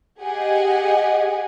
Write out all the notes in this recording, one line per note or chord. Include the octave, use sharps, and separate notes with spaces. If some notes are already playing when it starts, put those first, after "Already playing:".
G4 G#4 D#5 F#5 G#5